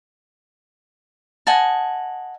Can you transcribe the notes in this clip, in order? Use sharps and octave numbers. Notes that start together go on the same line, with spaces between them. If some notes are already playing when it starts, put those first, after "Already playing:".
D#5 F#5 G#5 A5